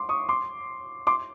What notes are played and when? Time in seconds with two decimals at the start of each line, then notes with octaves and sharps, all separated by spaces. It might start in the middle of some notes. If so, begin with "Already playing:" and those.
Already playing: C6 D6
0.09 C#6 D#6
0.29 C6 D6
1.07 C6 D6